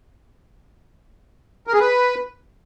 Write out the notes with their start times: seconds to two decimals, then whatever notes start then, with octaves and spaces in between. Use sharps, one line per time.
1.67 A#4
1.74 G#4
1.80 B4